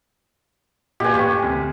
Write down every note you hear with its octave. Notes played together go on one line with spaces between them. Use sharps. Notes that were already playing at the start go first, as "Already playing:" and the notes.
A#2 G4 B4 G#5
A1 C#6
D2 C3